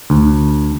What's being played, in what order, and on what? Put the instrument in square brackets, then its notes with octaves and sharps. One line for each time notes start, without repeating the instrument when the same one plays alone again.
[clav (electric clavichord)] D2